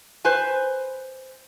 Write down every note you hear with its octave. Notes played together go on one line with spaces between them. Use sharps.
B4 C5 G#5